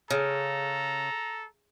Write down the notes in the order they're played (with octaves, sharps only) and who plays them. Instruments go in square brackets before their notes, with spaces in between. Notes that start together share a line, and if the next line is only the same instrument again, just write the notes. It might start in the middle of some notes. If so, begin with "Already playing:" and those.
[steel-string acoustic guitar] C#3 [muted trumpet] A4 [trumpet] A#5